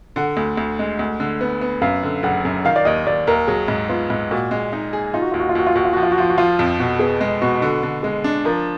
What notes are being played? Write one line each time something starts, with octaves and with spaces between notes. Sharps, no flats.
D3 F#5
D2
D2
G#3
D2
D3
B3
B3
F#2 F5
D3
F#1 F#5
F#2
D#3 F5
D5
D#2 D#5
D#2 D5
D#2 A#4
F#3 G#4
G#2
B3 F4
G#2
A#2 F#4
G#3
D#4
G#4
D#4 F4
F#4
D#2 F4
F#4
F4
D#2 F#4
F4
D#2 F#4
F4
F3 F#4
F4
F#4
F3 F4
F#4
F3 F4
F2
B2 F#4
B3 G#4
G#3
B2 F#4
D3 F#4
D3
G#3 G#4
D4
F3 A#4